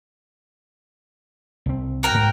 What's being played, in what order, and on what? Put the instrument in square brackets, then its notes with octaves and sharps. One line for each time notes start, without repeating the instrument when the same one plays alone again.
[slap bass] C2 C4
[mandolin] F#4 A#4 G5
[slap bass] G#2